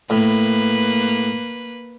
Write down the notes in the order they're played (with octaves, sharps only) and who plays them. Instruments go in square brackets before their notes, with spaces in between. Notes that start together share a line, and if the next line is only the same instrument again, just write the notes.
[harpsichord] A2 [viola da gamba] A#3 B4